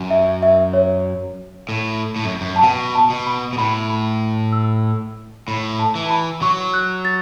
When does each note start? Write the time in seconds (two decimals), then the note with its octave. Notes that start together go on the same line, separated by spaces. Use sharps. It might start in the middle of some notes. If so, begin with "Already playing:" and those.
Already playing: F#2
0.11 E5
0.43 E5
0.73 C#5
1.69 A2
2.16 A2
2.24 F#2
2.41 F#2
2.56 A5
2.63 B2 F#5
2.95 A5
3.10 B2
3.27 B5
3.53 B2
3.58 A2 B5
3.90 B5
4.52 E6
5.47 A2 B5
5.79 A5
5.95 E3
6.06 A5
6.10 B5
6.42 F#3 C#6
6.74 F#6
7.05 A6